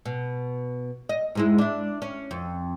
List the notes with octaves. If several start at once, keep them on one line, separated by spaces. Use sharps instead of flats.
B2
D#5
G#2 G#3 E4
D4 E4
C#4
F2